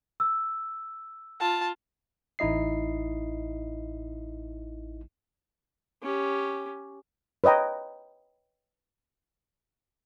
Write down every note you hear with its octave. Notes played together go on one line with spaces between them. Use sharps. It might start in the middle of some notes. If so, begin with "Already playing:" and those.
E6
F4 A5
A1 D#4 E4 D#5 C7
C#4 G4
B4 C#5 D#5 G5 A#5